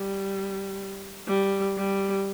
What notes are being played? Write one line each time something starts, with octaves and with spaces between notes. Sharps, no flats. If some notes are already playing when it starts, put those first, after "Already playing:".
Already playing: G3
G3
G3